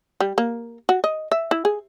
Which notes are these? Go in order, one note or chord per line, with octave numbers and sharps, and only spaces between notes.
G3
A#3
F#4
D#5
E5
E4
G#4